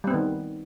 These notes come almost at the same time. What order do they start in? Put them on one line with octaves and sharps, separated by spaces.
G3 C4 B3 D#3